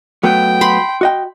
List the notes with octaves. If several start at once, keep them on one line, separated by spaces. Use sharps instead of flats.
F#3 A3 B3 G5
B5 C6
F#4 D#5 G5